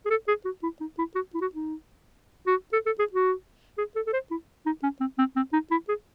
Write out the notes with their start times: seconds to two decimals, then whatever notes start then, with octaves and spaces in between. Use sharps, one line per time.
0.06 G#4
0.10 A4
0.28 G#4
0.45 F#4
0.63 E4
0.81 D#4
0.98 E4
1.15 F#4
1.35 E4
1.41 F#4
1.55 D#4
2.47 F#4
2.73 A4
2.86 A4
2.99 G#4
3.12 F#4
3.78 G#4
3.96 A4
4.07 A4
4.13 C5
4.31 E4
4.66 D#4
4.83 C#4
5.01 C4
5.18 C4
5.36 C4
5.53 D#4
5.71 E4
5.89 G#4